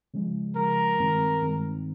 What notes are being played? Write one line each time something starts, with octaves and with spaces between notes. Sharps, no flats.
C#3 F3 G#3
C#3 F3 G#3 A#4
G2 D#3 G#3 C4
G2 D#3 G#3 C4